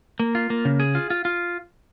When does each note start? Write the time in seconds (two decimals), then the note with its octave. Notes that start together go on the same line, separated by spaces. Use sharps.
0.20 A#3
0.35 F4
0.50 A#3
0.65 C#3
0.80 G#4
0.95 F4
1.10 F4
1.25 F4